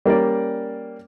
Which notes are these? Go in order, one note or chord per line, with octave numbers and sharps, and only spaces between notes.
G3 A#3 C#4 D5